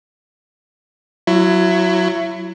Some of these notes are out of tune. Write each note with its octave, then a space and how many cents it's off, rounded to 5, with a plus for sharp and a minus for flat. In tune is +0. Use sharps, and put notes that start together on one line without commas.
F#3 +0 E4 +25